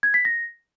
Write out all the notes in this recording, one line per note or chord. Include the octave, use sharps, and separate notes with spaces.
G#6
B6
A#6